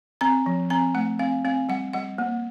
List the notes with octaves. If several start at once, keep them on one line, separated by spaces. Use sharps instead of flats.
C4 A#5
F3
C4 A#5
A3 F#5
C4 F5
C4 F5
G3 F#5
G3 F#5
A#3